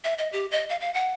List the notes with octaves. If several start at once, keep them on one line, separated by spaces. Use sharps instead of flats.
E5
D#5
G4
D#5
F5
F5
F#5